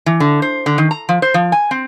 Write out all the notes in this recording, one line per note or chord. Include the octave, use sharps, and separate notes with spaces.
E3
D3
C5
D3
D#3
A#5
F3
C5
F3
G#5
C4